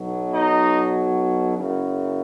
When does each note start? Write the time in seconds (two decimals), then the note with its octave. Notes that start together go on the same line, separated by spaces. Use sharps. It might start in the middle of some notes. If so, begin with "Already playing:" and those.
Already playing: B1 B2 F#3
0.33 D#4 D#5
1.56 F#1 F#2 C#3